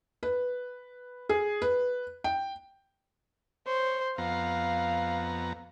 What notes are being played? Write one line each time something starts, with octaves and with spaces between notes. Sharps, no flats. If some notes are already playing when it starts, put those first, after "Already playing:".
B4
G#4
B4
G5
C5 C#5
F2 B3 F5 A#5